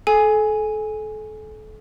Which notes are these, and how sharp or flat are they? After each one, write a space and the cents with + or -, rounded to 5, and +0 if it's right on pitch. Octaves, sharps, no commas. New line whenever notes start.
A4 -35 G#5 +0